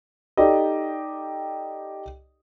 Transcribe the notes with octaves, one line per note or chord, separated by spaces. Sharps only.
D#4 G4 A4 D5 D#5